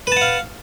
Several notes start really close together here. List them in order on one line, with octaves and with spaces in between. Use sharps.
B4 A5 F#5 F5